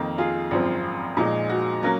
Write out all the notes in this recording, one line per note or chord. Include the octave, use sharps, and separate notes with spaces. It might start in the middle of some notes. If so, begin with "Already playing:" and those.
Already playing: F2 D#3 A#3
F4 G#4
G#1 F#2 F3 C4
A#2 F3 G#3 D#4
F#4
F#3 A#3 C#4